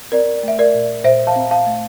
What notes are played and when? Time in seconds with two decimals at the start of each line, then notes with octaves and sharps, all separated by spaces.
0.12 C4 A#4 D5
0.43 A3 E5
0.59 A#4 D5
0.74 A#2
1.04 A#2 C5 E5
1.27 F5 A5
1.36 C4
1.51 F5 A5
1.66 A3